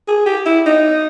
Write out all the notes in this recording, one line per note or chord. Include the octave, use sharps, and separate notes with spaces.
G#4
G4
E4
D#4